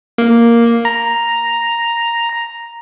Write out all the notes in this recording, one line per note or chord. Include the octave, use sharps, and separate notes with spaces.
A#3
A#5